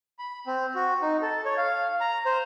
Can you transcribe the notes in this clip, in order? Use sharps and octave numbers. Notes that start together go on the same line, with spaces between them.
B5
C4
F#4
D#4
A4
C#5
F5
A#5
C5